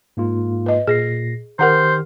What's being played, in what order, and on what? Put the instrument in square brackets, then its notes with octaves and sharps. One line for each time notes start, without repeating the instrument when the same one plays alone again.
[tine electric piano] G#2 A#3 F4
[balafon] B4 D#5
[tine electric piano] A#2 A#6 C7 [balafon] G#4
[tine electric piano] D#3 G4 F6 [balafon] A#4 F#5 A#5 [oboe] C5